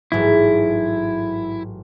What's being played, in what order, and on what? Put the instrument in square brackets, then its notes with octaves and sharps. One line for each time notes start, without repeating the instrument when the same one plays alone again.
[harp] A1 G#2 F#3 [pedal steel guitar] E4